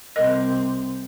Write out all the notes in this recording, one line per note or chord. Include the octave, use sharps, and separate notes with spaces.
C2 C4 A#4 D#5